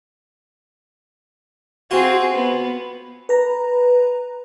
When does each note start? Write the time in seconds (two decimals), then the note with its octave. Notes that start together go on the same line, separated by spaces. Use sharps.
1.91 C4 F4 F#4 G#4
2.34 B3
3.29 B4 A#5